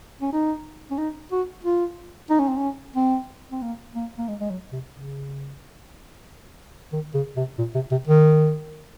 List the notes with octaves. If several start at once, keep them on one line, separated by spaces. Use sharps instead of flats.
C#4
D#4
C#4
D#4
F#4
F4
D#4
C#4
C4
C#4
C4
C4
A#3
A#3
A#3
G#3
G#3
F#3
C3
C#3
D#3
C#3
C3
A#2
C3
C3
D#3